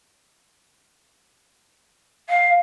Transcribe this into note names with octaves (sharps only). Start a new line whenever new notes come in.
F5